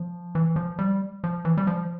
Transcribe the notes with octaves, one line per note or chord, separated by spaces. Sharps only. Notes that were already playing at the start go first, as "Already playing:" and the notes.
Already playing: F3
E3
F3
G3
F3
E3
G3
F3